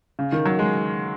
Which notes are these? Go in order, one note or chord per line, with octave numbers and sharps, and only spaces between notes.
C#3
D#3
F#3
G#3